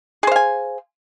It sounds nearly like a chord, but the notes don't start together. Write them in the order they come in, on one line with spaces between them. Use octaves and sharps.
G#4 C5 F5 G#5